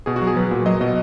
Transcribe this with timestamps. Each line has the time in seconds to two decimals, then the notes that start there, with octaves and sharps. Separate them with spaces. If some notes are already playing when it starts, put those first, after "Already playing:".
0.06 B2 G#4
0.16 F#4
0.22 F#3
0.27 G#4
0.36 F#3 B4
0.51 A#2
0.66 F#3 D#5
0.81 B2 D#5